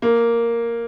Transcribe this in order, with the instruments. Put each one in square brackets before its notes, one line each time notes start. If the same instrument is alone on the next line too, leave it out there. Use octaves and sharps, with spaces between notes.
[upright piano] A#3